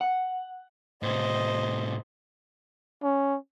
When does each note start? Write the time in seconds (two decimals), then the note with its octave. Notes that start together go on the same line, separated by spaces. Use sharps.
0.01 F#5
1.03 A2 C3 C5 D#5
3.03 C#4